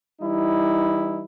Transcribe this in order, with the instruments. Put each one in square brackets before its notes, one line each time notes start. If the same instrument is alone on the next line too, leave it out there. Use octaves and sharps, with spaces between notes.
[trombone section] E3 G3 D#4 E4